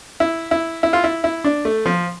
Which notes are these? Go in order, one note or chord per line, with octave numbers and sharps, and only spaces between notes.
E4
E4
E4
F4
E4
E4
D4
A3
F3